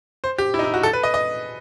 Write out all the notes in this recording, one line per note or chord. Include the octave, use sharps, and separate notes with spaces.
C5
G4
E4
D#4
E4
F#4
A4
B4
D#5
D#5